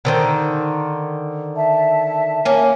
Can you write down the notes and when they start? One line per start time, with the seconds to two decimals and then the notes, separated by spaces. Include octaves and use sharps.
0.05 D3 D#3 C5
1.57 E5 A5
2.45 A#3 C#4